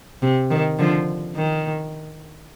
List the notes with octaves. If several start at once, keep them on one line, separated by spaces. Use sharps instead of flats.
C3
D#3
D3 F3
D#3